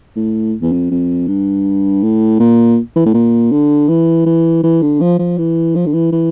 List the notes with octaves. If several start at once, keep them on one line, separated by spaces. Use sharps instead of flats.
A2
E2
F2
F2
G2
A2
A#2
E3
A2
A#2
D3
E3
E3
E3
D3
F3
F3
E3
F3
D3
E3
E3